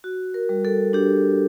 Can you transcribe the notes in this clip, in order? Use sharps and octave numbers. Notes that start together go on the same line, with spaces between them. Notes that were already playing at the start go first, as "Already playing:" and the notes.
F#4
A#4
G3
A4
D4 G4